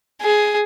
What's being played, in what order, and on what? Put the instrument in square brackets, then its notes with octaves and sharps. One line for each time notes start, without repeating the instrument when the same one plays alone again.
[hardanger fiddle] G#4